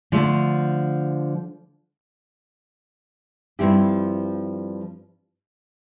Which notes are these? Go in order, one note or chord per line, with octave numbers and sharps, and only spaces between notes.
D3 F3 A3
G2 F3 C4 E4 G4